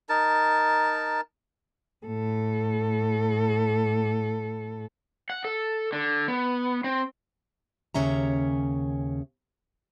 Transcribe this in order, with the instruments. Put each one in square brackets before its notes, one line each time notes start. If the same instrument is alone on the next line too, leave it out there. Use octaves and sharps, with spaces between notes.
[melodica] D#4 A#4 A5
[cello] A2 A4
[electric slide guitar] F#5
A4
D3
B3
C4
[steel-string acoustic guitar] D#2 C#3 C#4 E5 A#5